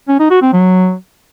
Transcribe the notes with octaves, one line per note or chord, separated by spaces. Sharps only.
C#4
D#4
F#4
C4
F#3